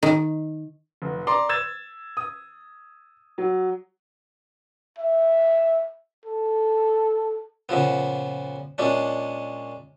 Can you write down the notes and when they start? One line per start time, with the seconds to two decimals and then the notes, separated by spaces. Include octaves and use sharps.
0.03 D#3
1.02 F1
1.27 D5 A#5 C6 D6
1.49 E6 G#6 A6 E7
2.17 D#6
3.38 F#3
4.99 E5
6.26 A4
7.69 A#2 C#3 F3 B3
8.78 A#2 G#3 C#4 D4